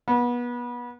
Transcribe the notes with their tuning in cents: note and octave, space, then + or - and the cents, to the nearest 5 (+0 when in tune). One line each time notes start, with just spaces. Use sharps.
B3 -25